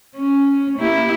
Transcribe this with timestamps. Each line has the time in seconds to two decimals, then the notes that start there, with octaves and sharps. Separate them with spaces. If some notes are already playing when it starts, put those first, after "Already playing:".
0.16 C#4
0.78 A#3 E4 G4